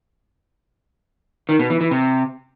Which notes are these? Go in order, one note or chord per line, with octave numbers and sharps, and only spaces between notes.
D#3
B2
E3
E3
C3